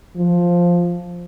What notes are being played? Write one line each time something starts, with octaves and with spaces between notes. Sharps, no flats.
F3